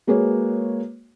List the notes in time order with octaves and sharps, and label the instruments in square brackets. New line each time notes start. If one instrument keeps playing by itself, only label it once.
[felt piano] G#3 A#3 F#4 G#4 B4 C#5